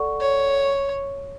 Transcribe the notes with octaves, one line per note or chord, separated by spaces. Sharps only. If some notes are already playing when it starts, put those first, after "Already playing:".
Already playing: A4 D5 F#5 C#6
C#5